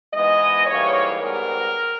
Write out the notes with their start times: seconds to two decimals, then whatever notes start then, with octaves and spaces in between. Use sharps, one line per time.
0.13 G#2 E3 G#3 B3 D#5
0.66 G#2 E3 G3 A#3 C#5
1.20 G#2 G3 B3 A#4